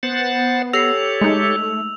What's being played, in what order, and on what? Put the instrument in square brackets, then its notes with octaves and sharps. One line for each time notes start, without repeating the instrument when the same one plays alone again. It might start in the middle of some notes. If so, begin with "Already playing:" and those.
[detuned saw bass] B3 [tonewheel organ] C5 F#5 A6
[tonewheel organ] G4 A4 C#5 [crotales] E6 F7 [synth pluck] A#6 C7
[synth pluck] G#3 D#4 [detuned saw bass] A3